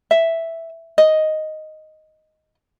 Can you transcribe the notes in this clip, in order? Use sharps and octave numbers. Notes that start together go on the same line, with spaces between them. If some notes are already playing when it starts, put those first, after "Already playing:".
E5
D#5